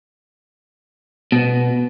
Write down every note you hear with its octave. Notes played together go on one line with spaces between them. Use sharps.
B2